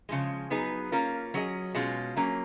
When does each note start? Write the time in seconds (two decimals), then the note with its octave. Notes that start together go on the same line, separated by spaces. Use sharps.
0.09 C#3 F3 G#3
0.50 F#3 B3 D#4 G#4 B4
0.92 A#3 C#4 F4 A#4
1.34 F#3 C#4 G#4 D#5
1.75 B2 G#3 C#4 F4
2.17 F#3 A#3 C#4